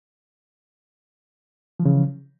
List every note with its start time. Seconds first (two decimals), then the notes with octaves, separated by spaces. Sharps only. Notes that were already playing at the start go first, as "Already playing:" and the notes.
1.80 F3
1.82 E3
1.85 C#3